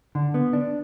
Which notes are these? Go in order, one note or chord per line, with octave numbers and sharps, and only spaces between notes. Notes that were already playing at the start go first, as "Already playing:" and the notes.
D3
B3
D4